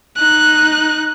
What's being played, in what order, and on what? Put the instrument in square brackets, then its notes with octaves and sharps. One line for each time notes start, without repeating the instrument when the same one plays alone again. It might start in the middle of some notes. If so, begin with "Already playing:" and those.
[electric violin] D#4 F#6